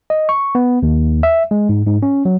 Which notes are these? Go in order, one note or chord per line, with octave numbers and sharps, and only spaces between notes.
D#5
C#6
B3
D#2
E5
G#3
G#2
G#2
C#4
F#3